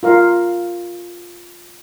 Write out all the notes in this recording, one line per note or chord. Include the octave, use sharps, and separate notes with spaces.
F4 A#4 F5